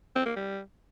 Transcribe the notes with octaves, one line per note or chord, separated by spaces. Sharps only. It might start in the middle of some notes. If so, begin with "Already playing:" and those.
C4
A#3
G3